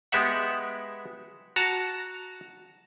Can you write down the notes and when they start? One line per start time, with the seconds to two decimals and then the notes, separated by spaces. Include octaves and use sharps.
0.12 G#3 B3 G4 E5 F#5
1.56 F#4 A5 A#5